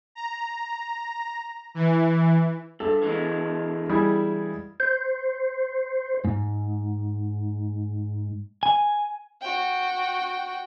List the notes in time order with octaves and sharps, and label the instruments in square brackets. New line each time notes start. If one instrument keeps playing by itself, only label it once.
[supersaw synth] A#5
E3
[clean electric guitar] G2 [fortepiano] A4
[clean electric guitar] E3 G#3
[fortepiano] G3 E4 G#4
[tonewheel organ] C5
[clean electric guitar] G#2
G#5
[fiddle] F#4 G5